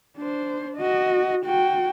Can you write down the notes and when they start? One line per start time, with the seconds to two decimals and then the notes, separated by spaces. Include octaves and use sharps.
0.17 D4 C5
0.78 F#4 D#5
1.45 F#4 G5